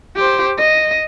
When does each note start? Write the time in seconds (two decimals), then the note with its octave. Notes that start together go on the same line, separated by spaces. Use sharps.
0.16 G4 C5
0.59 D#5